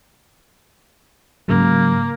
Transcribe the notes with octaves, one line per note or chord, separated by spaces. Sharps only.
G#2 C#3 F#3 A#3